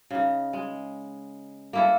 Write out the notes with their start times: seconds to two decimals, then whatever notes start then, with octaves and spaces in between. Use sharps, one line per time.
0.11 C#3 D#4
0.53 G#3
1.73 A#3 E4 A4